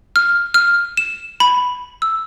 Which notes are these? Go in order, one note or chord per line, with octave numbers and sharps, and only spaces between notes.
F6
F6
E7
B5
E6